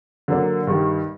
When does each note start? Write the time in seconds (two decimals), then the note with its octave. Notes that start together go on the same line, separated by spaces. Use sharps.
0.28 D3 F#3 A#3 D4
0.67 G2 D#3 G3